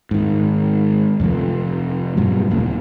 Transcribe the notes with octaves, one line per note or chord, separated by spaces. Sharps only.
G#2 D#3
F2 C3 F3 A3
G2 B2 F#3 G3
D#1 A#2 C#3 A3